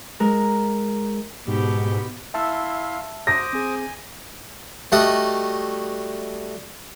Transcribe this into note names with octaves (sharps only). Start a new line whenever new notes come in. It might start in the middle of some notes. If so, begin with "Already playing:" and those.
G#3 A#4
G#2 B2 G4
E4 E5 F5 A5 C6 E6
F#4 C5 D6 D#6 A#6
C4 G#4 G#5
G3 A3 F#4 D#5